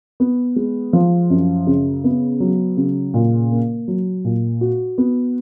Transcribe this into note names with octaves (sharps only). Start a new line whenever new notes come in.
B3
G#3
F3
F#2
C#3
B3
F#3
C#3
A#2
A#3
F#3
A#2
F#4
B3